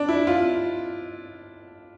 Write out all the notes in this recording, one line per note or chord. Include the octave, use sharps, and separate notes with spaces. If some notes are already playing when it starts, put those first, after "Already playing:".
Already playing: D4
E4
F4